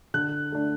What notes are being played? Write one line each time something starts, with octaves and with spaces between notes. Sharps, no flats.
D3 F#6
A3 D4